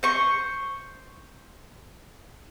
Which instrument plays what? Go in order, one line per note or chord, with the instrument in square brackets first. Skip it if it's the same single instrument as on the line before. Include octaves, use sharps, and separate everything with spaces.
[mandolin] C5 C#6